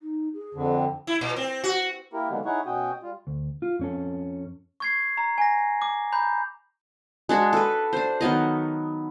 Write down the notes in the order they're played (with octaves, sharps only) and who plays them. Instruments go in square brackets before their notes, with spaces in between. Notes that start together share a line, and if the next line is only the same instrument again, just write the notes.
[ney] D#4
G#4
[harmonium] F2 D3
[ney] G5
[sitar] E4
A#2
C4
F#4
[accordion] A#3 E4 G4 A#4
D3 D#3 F#3 G#3 A#3 B3
D#4 E4 G#4 C#5 F#5 C#6
B2 C#4 F#4 G5 D#6
G3 F4
[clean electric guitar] D2
F4
F2 C#4 A4
[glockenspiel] C#6 G#6 C7
A#5
G#5 A#6
D6
A#5 B5 G6
[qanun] G#3 D4 F#4
A4 B4
D4 C5
D#3 F#3 B3 D#5